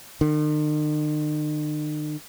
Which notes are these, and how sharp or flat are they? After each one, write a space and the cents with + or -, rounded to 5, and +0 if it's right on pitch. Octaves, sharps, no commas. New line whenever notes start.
D#3 -45